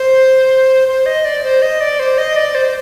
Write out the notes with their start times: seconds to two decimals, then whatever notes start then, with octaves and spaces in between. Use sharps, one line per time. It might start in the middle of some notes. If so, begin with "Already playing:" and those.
Already playing: C5
0.88 C5
1.06 D#5
1.25 D5
1.44 C5
1.62 D#5
1.81 D5
2.00 C5
2.18 D#5
2.36 D5
2.55 C5